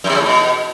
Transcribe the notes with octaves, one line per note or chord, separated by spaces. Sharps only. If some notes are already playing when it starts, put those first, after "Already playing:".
F#2
C3
C#3
A2
B2